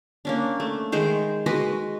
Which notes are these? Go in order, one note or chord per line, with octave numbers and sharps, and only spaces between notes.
A#3 C#4 D4
A3
D#3 G#3 C5 G5
G#3 F#4 B4 D#5